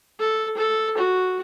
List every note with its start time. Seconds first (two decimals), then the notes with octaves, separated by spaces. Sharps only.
0.19 A4
0.57 A4
0.97 F#4